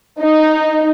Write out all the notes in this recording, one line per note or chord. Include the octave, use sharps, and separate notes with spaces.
D#4